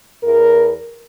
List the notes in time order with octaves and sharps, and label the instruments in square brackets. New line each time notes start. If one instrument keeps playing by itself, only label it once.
[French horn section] E2 A#4